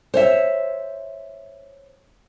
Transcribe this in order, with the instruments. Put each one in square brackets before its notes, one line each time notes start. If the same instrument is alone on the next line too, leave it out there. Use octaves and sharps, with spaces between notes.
[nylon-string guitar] C5 C#5 E5